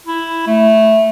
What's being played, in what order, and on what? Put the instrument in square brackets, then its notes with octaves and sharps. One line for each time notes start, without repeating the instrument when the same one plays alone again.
[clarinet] E4
A3